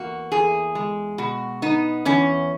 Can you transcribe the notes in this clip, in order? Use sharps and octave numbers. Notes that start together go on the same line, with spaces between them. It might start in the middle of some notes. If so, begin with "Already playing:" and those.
Already playing: E2 A#3 F#4
E2 G#4
G#3
B2 F#4
B3 D#4
E2 C#4